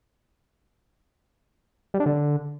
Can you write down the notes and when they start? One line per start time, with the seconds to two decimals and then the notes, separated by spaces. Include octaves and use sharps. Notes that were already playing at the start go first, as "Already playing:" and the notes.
1.94 G3
2.00 D4
2.06 D3